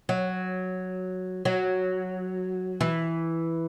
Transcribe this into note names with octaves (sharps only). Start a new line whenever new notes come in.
F#3
F#3
E3